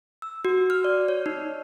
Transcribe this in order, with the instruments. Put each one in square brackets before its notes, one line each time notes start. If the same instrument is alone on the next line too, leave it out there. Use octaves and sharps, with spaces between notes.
[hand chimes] E6
F#4
F6
D5
C#5
D#4